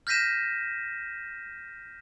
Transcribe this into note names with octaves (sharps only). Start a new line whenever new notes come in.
F6 G6 A#6 B6 D#7 E7